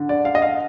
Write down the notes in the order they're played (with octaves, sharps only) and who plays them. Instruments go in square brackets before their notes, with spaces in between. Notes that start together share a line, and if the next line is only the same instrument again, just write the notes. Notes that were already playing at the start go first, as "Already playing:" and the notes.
Already playing: [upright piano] D3
[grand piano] D5
F5
D#5
F5